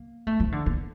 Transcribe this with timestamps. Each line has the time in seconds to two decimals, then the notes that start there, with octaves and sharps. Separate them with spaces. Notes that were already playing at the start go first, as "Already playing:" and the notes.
Already playing: A#3
0.27 A3
0.40 F3
0.52 D3
0.66 A#3